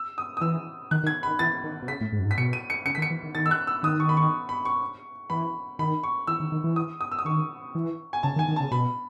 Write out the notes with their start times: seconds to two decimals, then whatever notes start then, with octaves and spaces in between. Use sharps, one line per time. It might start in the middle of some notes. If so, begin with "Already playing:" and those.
Already playing: E6
0.18 D#6
0.37 D#6
0.41 E3 E6
0.91 D#3 F#6
1.03 D#3
1.07 G#6
1.23 D#3 B5
1.39 E3 A6
1.64 D#3
1.82 B2
1.88 C#3 B6
2.01 A2
2.12 G#2
2.19 F#2
2.25 G#2
2.31 B6
2.38 B2 C#7
2.53 D#7
2.70 C#7
2.86 C#3 C#7
2.95 D#3 B6
3.02 C#7
3.10 E3
3.23 D#3
3.35 D#3 A6
3.46 E6
3.51 F#6
3.67 E6
3.83 D#3 D#6
4.00 C#6
4.09 B5
4.17 C#6
4.49 B5
4.65 C#6
5.30 E3 B5
5.79 D#3 B5
6.03 C#6
6.27 E3 E6
6.40 D#3
6.52 D#3
6.64 E3
6.76 D#6
7.01 D#6
7.11 E6
7.19 D#6
7.25 D#3 C#6
7.75 E3
8.13 G#5
8.23 C#3 A5
8.36 D#3
8.39 G#5
8.48 D#3
8.56 C#3 A5
8.71 B2 B5